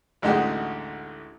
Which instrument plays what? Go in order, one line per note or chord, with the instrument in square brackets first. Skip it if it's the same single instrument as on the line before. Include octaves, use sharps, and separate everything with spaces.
[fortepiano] A1 D2 G#3 D#4 F#4 G4